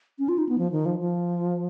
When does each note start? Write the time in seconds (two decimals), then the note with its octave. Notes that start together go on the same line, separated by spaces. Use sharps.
0.19 C#4
0.29 F4
0.38 D#4
0.49 B3
0.58 F3
0.72 D#3
0.86 F3
0.99 F3